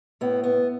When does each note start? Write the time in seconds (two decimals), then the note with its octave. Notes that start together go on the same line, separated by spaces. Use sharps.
0.21 A2 B3
0.43 B3